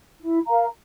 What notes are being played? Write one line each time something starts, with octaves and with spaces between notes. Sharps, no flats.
E4
A#4 F5 A#5